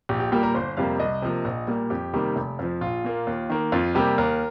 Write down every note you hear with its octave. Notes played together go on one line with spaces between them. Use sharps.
A#1 G4
G4
A#2 G3 A#3 G4
A#4
G1 C5
F2 C3 G3 A#3 F5
C2 D#5
C3 F3 A#3
A#1
A#2 G3 A#3
F2 G4
C3 D#3 G3 A#3
F1
F2 F3
A#1 F4
A#2 A#3
D#2
D#3 A#3
F2 F4
C3 G3 A#3 G4
D#2 A#4